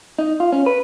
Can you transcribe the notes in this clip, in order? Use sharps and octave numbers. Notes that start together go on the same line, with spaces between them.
D#4
F4
C#4
B4